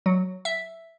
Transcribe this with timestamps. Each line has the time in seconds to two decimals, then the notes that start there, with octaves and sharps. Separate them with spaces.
0.06 F#3
0.45 E5